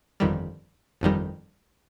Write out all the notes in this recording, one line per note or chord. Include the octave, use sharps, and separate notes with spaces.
G1 F2 D#3 G3
G1 F2 D#3 G3